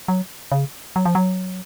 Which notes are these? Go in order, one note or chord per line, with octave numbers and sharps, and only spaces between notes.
F#3
C#3
F#3
F3
F#3